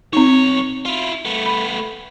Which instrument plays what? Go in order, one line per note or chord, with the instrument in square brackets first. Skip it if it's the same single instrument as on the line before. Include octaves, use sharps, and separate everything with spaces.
[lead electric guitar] B1 C#5 [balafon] C4 D#4
[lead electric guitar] E4 F4
A3 B3
[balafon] B5